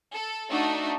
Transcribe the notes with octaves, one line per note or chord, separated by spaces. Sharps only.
A4
A3 D4 D#4 F#4 A4